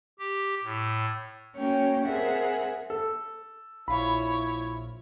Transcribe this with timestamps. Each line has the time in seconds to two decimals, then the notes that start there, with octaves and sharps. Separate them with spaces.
0.19 G4
0.64 A2
1.54 A#3 C#4 F#4 C#5 G5
2.05 C4 G#4 A#4 E5 F#5
2.90 A4
3.88 A#1 E4 F4 C#5 B5